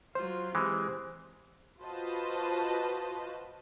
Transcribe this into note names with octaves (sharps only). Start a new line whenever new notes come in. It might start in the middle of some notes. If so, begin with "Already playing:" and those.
F#3 F4 C5
E3 G#3 C4 G4
F4 F#4 B4 C5 D#5 A5